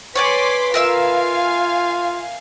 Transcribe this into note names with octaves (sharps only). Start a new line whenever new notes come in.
B4 C#5 D5 G#5 C6 D6 B6
F4 A#4 E5 F5 G#5 E6